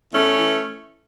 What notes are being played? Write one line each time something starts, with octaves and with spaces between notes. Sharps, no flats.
E2 A3 C#4
E3